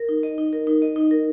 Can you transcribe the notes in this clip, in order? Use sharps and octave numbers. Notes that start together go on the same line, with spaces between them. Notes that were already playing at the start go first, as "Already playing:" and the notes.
Already playing: A#4
D#4
D#5
D#4
A#4
D#4
D#5
D#4
A#4